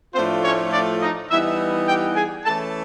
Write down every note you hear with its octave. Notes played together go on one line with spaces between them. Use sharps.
A2 F3 A3 C4 D4 F4 C5
C#4 C#5
D4 D5
D#4 D#5
E3 G3 B3 D#4 E4 E5
G4 G5
G#4 G#5
E3 A3 C#4 E4 A4 A5